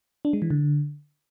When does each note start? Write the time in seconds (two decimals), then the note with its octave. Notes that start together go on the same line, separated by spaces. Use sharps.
0.25 D4
0.33 G#3
0.42 E3
0.50 D3